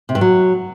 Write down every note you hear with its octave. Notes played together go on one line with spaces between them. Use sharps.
C3
G2
F#3